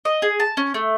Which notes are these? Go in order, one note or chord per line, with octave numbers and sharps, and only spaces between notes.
D#5
G#4
A5
C#4
A3